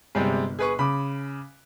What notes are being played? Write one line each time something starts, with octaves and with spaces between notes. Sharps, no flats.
G1 C3 G3 G#3
G#4 B4 C#6
C#3 B5 D6